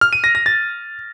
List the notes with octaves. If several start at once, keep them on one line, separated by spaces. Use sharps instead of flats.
F6
D#7
A#6
A#6
A6